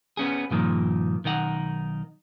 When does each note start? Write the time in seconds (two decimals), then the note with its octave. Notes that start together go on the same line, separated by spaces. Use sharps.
0.17 B3 C#4 G#4
0.51 G2 A#2 D#3 F3
1.24 B1 D#3 D#4 F#5